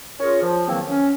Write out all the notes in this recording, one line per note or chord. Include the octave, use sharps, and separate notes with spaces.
C#4 F4 G#4 A#4 C#5
F3
E2 D#3 F#3 A#3 C4
C#4